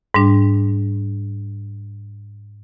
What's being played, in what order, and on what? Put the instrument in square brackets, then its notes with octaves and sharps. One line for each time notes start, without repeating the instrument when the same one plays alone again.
[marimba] G#2 G3 D4